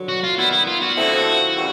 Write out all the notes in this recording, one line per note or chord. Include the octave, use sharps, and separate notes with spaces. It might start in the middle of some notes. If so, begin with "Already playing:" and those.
Already playing: G2 D3 F#3
F#4
F4
D#3 G3 B3 E4
E4
F4
F#4
D3 F3 A3 C4 E4
C#3 E3 G3